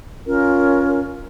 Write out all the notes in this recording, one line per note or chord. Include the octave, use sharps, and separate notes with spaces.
C#4 F4 A#4